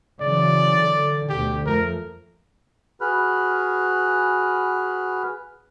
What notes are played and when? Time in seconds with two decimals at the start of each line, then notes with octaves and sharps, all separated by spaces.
0.21 C#3 E3 F#3 D5
0.78 D3
1.29 D2 B2 D3 G4
1.66 F2 F3 A3 A#4
3.01 F#4 G#4 B4 B5 F6 F#6